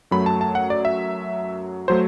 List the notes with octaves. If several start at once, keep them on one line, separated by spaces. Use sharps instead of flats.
F#2 F#3 A3 B5
A5
A5
F#5
D5
E5
F#3 A3 C5